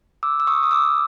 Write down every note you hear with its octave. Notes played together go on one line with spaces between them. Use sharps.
D6 E6
E6
C#6 D#6
D#6
D6 E6